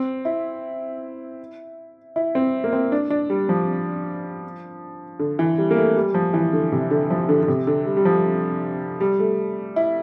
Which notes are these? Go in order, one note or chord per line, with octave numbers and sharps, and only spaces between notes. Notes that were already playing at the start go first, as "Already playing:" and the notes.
Already playing: C4
E4
E4
C4
A#3
C4
D4
D4
G3
F3
D3
E3
G3
A#3
A3
G3
F3
E3
D3
C3
D3
F3
D3
D3
C3
D3
G3
G3
F3
G3
A3
E4